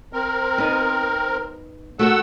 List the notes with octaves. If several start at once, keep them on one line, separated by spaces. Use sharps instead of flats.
C4 A#4
B3 D#4
A3 F#4 A#4 F#5 E6